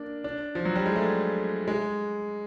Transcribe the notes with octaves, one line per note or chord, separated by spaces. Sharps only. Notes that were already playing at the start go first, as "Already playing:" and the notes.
Already playing: A#3 D4
D4
F3
F#3
G3
G#3
A3
G#3